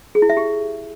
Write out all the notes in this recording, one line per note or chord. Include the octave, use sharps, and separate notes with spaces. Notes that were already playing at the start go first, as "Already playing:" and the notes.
G#4
E4
E5
G4